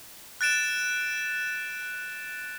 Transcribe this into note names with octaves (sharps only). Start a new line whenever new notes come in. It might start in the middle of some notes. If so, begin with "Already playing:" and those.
F#6 A6 D7 E7